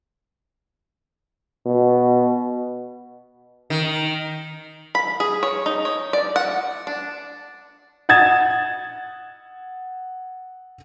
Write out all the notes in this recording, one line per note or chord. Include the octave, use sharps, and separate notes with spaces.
B2
D#3
B5
G#4
C#5
D#4
C#5
D5
F#5
D4
F#5 D#6 G#6 A6 E7